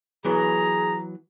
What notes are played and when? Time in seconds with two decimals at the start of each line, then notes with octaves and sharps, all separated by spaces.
0.25 E3 F#3 B3 G#4 A#5